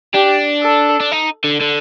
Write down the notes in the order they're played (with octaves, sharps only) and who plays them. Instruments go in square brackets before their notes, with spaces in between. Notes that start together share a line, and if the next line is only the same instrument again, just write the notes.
[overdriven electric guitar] D4 [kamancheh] G4
[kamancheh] A4
[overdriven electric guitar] D4
D#4
D3
D3